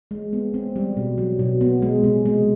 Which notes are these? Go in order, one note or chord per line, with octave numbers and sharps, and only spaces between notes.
G#3
B3
C4
G3
B2
F#3
B2
B3
G#3
C3
G#3